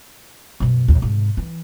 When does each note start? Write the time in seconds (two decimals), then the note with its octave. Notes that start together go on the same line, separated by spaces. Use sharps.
0.60 F#2 B2
0.88 D#2 A#2
1.02 G#2 C3
1.37 E3